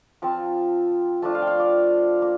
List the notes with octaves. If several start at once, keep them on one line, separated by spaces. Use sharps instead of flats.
F3 C4 F4 A5
F3 A3 D4 F4 A5
F5
G5
F5
D5
A#3